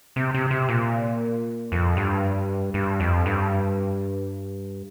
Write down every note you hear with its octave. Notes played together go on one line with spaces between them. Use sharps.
C3
C3
C3
A#2
F2
G2
G2
F2
G2